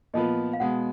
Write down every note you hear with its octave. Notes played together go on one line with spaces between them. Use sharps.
A#2 F3 B3 F4 B4 D#5
F5
B2 G#3 B3 F#5